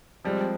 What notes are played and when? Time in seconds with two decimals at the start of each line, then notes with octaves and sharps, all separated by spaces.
0.24 F3 G3 G#3 C4